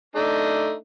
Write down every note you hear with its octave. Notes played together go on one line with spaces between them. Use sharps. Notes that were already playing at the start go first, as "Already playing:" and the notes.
A3 D4 D#4